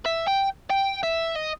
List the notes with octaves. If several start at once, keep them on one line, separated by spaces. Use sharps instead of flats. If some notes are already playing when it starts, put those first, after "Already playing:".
E5
G5
G5
E5
D#5